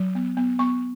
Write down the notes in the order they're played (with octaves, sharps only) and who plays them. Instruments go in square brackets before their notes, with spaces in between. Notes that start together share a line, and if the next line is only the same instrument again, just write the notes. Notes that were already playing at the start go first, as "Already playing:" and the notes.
Already playing: [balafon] F#3
B3
B3
B3 C#6